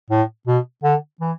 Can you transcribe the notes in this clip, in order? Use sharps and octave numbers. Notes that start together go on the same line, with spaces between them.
A2
B2
D3
E3